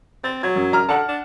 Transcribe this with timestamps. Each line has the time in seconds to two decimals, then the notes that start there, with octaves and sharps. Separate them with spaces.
0.24 C4 A6
0.43 F#3 G#6
0.56 F#2
0.73 F#2 A#5 F6
0.89 D3 F#5 A5
1.08 D4